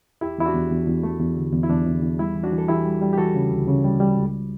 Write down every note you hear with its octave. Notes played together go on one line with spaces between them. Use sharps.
E2 E4 G4
E2 E4
D4 F#4
E2
E2
E2
A3
E2
D3
E2
E4
E2 D4
E2
E2
G3 E4
E3
D4 F#4
E3
A4
E3 E4 G4
G3
G3
G4
E3 F#4 A4
C#3
D2
C#3
G3
G3
C#2